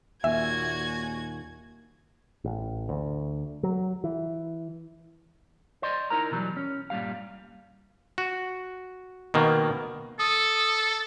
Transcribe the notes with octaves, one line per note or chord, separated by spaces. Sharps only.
D#2 A#2 F#4 E5 G#5 G#6
A1
D2
F#3
E3
C5 D5 D#5 C6
D#4 E4 A#4 A#5
B2 E3 F#3 G3
C#4
G2 A#2 G3 F5
F#4
B2 D#3 A#3
A4 D#6